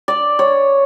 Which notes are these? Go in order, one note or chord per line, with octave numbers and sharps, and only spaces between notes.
D5
C#5